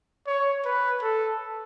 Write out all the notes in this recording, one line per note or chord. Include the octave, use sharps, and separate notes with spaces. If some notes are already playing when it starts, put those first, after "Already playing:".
C#5
B4
A4